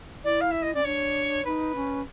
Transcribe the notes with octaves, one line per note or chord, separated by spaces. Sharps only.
E4 D5
F5
E5
D#5
C#4 D5
D4 C#5
D#4 B4
C#4